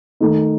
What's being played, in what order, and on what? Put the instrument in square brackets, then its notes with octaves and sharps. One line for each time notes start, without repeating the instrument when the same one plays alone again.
[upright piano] D#3 A3 D#4 A4